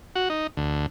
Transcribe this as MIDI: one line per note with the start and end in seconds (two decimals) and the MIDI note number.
0.16 0.29 66
0.30 0.47 63
0.57 0.86 38